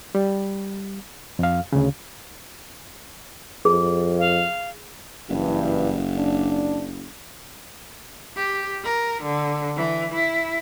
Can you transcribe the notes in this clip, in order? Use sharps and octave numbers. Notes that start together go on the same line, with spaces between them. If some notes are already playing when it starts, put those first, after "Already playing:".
G3
F2 F5
D2 C#3
F2 G#4
F5
F#1 G2 E3
D4
G4
A#4
D3
E3
E4